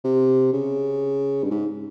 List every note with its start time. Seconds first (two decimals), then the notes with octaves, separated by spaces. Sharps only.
0.04 C3
0.53 C#3
1.43 G2
1.51 G#2